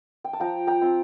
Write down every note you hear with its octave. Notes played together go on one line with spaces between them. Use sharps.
G5
A5
F3 G5 A#5
G5 A#5
C4 F4